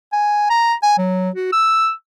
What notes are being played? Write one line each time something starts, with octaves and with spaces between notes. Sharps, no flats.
G#5
A#5
G#5
F#3
F#4
E6